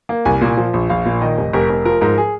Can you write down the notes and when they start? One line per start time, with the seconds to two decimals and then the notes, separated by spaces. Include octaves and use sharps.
0.09 A#3
0.25 C2 G#5
0.41 A#2
0.57 F3
0.73 A#1
0.89 A#1 F5
1.05 A#2
1.21 D#3 D#5
1.37 F1
1.53 F1 A#4
1.69 F1
1.85 F3 A#4
2.01 G#2 A#4
2.18 G#4